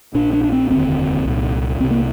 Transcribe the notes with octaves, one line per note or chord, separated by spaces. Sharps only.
A#1 A#2 D4
D4
D4
C4
F1 D#2 D3 C4
C2 A#2
C2 C3 C4
A#3